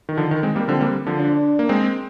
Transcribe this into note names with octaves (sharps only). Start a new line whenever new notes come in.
D#3
D3 F3
D#3
G#3 C4
G3 A#3
D3 F3 C4
G3 A#3
D3 F3
D4
A#3
G#3 C4